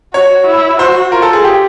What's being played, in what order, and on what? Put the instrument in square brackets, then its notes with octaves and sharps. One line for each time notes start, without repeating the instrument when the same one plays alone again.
[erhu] F#4 [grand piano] C#5
[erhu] E4
[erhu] F#4 [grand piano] C5
[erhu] F4 [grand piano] A#4
[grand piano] A4
G#4
G4